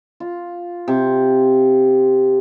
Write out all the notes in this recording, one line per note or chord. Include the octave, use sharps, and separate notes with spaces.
F4
C3